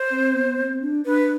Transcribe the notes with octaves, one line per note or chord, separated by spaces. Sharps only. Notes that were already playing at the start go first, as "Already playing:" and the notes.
Already playing: C5
C4
B3
C4
D4
D4 B4